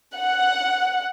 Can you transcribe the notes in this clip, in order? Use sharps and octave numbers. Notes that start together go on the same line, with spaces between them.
F#5